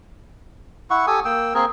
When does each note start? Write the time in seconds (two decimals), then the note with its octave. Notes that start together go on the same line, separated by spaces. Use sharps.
0.90 E4 F#5 C#6
1.07 G4 A4 G#5 D#6
1.25 A#3 G5 E6
1.54 A#3 C4 G#4 A#4